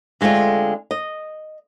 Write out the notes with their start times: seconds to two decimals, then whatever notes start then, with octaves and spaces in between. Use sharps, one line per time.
0.21 D3 G#3 A3 C4 F4
0.91 D#5